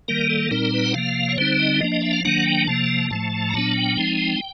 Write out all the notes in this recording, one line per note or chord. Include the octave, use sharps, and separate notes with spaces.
D#3 G3 A#3 A#4
A4
A#2 G3 C4 D#4 A#4
B4
F#5
C3 F3 A#3 F5
C#5
D3 G3 C4 D#4 C5
D#5
F3 A#3 D4 D#5
D#5
E5
F5
D#3 F#3 A#3 D4 F#5
G5
C3 F3 A#3 A5
A2 F3 A3 A5
A#5
A#2 F#3 B3 D4 A5
G5
F3 G#3 C4 D#4